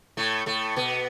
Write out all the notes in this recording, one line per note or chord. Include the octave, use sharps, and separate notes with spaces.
A2 A3
A2 A3
B2 B3